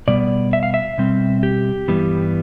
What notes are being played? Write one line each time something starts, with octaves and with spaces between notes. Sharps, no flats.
B2 G3 B3 D5
E5
F5
E5
B2 G3 C4
G4
G2 E3 G3 B3